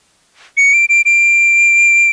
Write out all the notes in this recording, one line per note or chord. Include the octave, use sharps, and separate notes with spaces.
C#7
D7
D7
D7